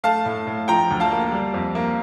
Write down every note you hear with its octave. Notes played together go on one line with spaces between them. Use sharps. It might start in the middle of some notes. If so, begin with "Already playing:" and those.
A3 F5 A5
A2
A2
F3 G5 A#5
D2
F5 A5
A#3
G3
F2
A#3